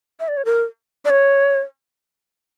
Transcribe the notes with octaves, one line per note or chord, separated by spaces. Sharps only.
E5
D5
C#5
A#4
D5
C#5